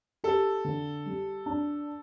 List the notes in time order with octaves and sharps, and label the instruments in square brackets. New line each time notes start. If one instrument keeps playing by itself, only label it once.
[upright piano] G4 [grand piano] A4
[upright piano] D3
G3
D4